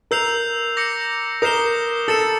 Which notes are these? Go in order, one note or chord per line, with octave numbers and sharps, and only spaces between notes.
A#4 E6 G6 C7 F7
D6 G6 A#6 C#7
A#4 D#6 G6 C7 E7 G7
A4 E6 A6 C#7 E7